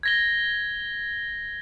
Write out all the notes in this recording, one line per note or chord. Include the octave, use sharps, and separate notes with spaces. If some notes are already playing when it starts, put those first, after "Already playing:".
G#6 A#6 G7